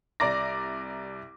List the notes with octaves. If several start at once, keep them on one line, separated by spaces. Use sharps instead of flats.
C2 D5 A#5 D6 A#6